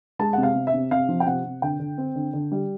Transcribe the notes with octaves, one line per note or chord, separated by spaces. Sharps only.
G#3 A5
C3 F#5
F5
C3
E5
C3
C3 F5
F3
G5
C3 F#5
C3
D3 G5
D3
C4
D3
D3
G3